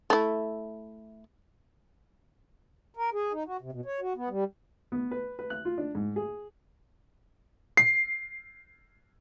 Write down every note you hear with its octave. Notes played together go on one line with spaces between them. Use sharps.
A3 E4
A#4
G#4
D#4
F#4
C3
B2
C#5
F#4
B3
G3
B3
B4
B4
F#6
F4
D4
G#2
G#4
C7